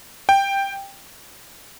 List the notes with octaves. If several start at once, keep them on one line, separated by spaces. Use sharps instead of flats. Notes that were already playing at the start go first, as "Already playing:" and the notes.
G5